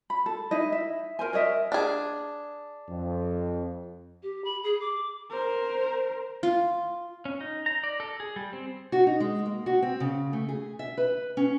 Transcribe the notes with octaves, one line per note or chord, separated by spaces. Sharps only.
B5
A4
D#4 E4 D#5
E5
A#4 C5 G#5
A#4 C#5 D#5 E5
D4 G#4
F2
G4
B5
G#4
D6
A#4 C5
F4
C#4
D#4
A#5
D5
A4
G#4
G3
C4
F#4
D#4
G#3
A#3
F#4
C4
C#3
A3
G#4
E5
B4
C#4